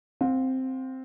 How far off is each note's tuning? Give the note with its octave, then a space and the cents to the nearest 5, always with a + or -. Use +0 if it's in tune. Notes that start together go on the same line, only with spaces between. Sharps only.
C4 +0 F5 +35